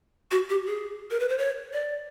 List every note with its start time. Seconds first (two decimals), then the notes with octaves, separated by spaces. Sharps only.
0.31 F#4
0.50 G4
0.67 G#4
1.11 A#4
1.20 B4
1.29 C5
1.38 C#5
1.73 D5